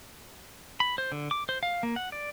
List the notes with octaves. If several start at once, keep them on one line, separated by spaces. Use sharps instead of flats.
B5
C5
D3
D6
C5
F5
A#3
F#5
D5